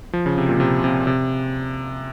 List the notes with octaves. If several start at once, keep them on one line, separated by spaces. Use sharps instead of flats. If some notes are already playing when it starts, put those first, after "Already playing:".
F3
C#3
C3
A#2
C3
C3
C3